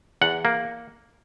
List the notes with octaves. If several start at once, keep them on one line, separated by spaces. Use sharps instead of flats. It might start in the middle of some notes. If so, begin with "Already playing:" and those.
E2 F#5
A#3